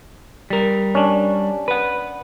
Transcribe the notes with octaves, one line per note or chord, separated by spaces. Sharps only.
G3 A#4
C#4 D4
B4 F#5